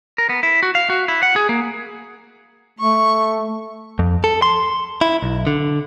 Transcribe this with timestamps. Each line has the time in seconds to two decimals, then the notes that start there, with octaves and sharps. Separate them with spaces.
0.18 A#4
0.29 B3
0.43 E4
0.63 F#4
0.75 F5
0.90 F#4
1.08 E4
1.23 F#5
1.36 G#4
1.49 A#3
2.79 A3 C#6
3.99 F2
4.24 A4
4.42 C6
5.01 E4
5.22 B1
5.47 D3